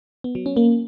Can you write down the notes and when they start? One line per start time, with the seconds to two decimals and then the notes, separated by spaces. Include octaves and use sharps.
0.24 B3
0.35 F#3
0.46 C#4
0.57 A#3